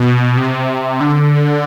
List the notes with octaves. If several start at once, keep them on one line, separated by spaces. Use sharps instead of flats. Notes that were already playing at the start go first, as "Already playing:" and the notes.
Already playing: B2
C3
D3